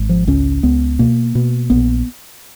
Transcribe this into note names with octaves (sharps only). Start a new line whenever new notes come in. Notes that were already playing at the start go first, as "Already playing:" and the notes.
Already playing: G#1
F3
C#2 C#4
C#2 B3
B2 A#3
B2
A#1 B3